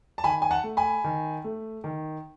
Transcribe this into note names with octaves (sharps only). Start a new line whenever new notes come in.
A5
D#3 G#5 B5
G#5
F#5 A5
A3
G#5 B5
D#3
A3
D#3